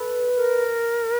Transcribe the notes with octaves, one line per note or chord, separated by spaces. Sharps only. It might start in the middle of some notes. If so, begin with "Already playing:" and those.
Already playing: A4 B4
A#4